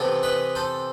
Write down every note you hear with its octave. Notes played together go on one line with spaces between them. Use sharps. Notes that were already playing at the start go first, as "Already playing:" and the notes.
Already playing: C3 E3 B3 A4
B4 D#5
A4 C5